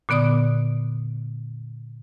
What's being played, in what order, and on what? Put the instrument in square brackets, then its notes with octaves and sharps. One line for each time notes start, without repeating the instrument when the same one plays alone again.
[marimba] A#2 D3 B3 D5 D#6